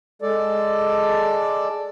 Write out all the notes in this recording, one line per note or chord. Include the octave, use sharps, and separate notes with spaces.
G#3 A4 D5